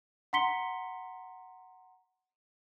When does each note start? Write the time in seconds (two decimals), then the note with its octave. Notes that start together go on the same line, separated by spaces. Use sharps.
0.33 F#5 A#5 C6 B6 C#7 G7